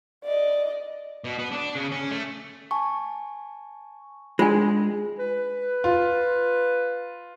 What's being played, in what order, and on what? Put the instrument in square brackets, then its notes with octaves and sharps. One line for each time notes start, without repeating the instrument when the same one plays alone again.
[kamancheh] D5 D#5
[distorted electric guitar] B2
B3
D4
C#3
C#4
A3
[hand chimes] G#5 A5 C#6
[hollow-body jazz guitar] G#3 [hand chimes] D4 [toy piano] F4 G#5
[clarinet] B4
[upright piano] F4